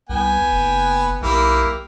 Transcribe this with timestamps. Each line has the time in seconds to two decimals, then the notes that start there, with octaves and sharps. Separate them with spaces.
0.10 C2 B3 G5 G#5
0.52 F#1
1.22 B1 A#3 E4 G4